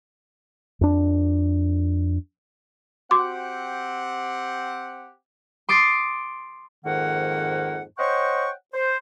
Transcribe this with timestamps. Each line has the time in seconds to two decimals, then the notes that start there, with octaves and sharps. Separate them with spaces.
0.81 F2 D4
3.11 C4 F#4 G4 F#5 C6 D6
5.69 C6 D6 D#6 A6 C7
6.85 F2 G#2 D#3 A#3 F#5
7.99 C5 C#5 D#5 F#5 G5 C#6
8.73 C5